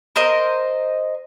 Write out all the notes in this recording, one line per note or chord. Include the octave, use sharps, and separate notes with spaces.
A#4 C5 D#5